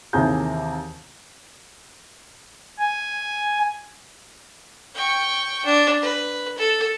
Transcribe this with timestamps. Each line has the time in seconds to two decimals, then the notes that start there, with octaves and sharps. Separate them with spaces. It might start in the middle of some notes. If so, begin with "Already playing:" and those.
0.13 D#2 C3 E3 G#4 A#5 G6
2.79 G#5
4.95 G5 C#6
5.65 D4
6.02 B4
6.57 A4